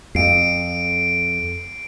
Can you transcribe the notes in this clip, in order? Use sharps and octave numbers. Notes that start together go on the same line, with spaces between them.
F2 C7 D7